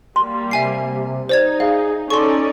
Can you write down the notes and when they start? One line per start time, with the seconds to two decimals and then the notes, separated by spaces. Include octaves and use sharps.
0.16 G3 A#3 C6
0.51 C3 E5 G#5 C7
1.29 D#4 C5 D5 G#6
1.60 G#4 E5 F5
2.10 C#4 D#4 A4 D5 C6 C#6